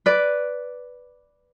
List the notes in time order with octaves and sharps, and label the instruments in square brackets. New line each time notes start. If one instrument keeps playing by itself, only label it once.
[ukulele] B4 D5